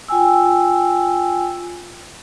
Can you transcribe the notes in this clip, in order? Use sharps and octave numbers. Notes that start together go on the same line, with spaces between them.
F4 G5 G#5 E6